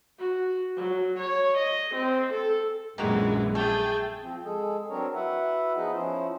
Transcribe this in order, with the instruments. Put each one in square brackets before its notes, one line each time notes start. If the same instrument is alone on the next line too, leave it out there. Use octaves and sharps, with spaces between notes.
[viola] F#4
F#3
C#5
D#5
C4
A4
[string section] A#1 F#2 E3 [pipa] D#3 A#3 F#4 [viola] G#3
[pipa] A3 [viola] G#4 G5 [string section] A6
[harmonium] F3 C4
G#3 G#4 A4
F#3 C4 D4 A#4 C#5
E4 F#4 B4 E5 F#5
F3 B3 D#4 G#4 B4 D#5
F3 C#4 E4 C5